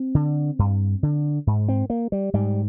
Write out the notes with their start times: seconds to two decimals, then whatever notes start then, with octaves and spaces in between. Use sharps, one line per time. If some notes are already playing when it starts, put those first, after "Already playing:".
Already playing: C4
0.15 D3
0.59 G2
1.03 D3
1.47 G#2
1.68 C4
1.90 A#3
2.12 G3
2.33 G#2 G3